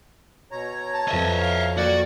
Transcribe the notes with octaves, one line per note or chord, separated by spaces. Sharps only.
B2 C#5 A#5
A5
F2 B4 D#5 E5 A#6
F5
A#3 F#4 D5 G5